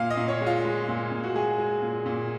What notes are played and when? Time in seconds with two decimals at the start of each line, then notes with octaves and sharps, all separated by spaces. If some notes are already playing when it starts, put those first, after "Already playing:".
Already playing: A#2 F5
0.10 D#5
0.17 A#2
0.28 C#5
0.41 G#3
0.46 F4
0.64 G#3
0.88 A#2
1.12 A#2
1.23 F#4
1.35 G#3 G#4
1.58 G#3
1.82 A#2
2.06 A#2